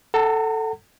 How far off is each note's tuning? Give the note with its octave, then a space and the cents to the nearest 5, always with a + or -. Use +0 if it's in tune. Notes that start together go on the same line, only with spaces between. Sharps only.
A4 +5 F#5 +25 A#5 -40